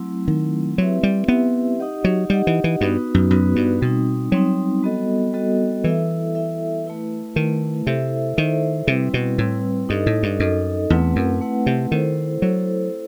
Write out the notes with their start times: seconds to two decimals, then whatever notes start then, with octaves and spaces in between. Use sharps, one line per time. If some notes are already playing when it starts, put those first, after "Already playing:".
Already playing: F#3 A3 C4 E4
0.27 D#3 F#3 A3 C4 E4
0.78 F#3 C4 E4 G4 B4 E5
1.03 G3
1.28 B3 C4 E4 G4 B4 E5
1.80 D#4 G4 D#5 F#5
2.04 F#3
2.30 G3 D#4 G4 D#5 F#5
2.47 E3
2.64 E3
2.81 G2 B3 D#4 F#4 B4
3.14 F#2
3.31 F#2 B3 D#4 F#4 B4
3.56 G2
3.81 B2 G3 C4 D#4
4.32 F#3 G3 C4 D#4
4.83 G3 B3 F#4 A4 D#5
5.33 G3 B3 F#4 A4 D#5
5.84 E3 E4 A4 E5
6.35 E4 A4 E5
6.85 A3 E4 B4
7.36 D#3 A3 E4 B4
7.87 C3 E4 A4 C5 E5
8.37 D#3 E4 A4 C5 E5
8.87 C3 G3 C4 E4 B4
9.14 B2
9.38 A2 G3 C4 E4 B4
9.89 G2 D#4 A4 D#5
10.06 A2
10.23 G2
10.40 F#2 D#4 A4 D#5
10.90 E2 A3 C4 E4 B4 F#5
11.16 F#2
11.41 A3 C4 E4 B4 F#5
11.66 C3
11.92 D#3 E4 A4 C5
12.42 F#3 E4 A4 C5